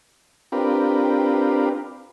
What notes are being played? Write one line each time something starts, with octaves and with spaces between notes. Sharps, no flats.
C4 D4 F4 G4 A#4 B4